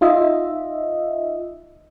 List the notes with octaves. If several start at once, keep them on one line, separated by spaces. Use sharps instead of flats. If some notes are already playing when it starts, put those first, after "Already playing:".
D#4 F4 D#5 E5